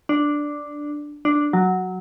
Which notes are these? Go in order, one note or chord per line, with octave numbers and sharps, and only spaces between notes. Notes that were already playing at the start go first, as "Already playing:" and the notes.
D4
D4
F#3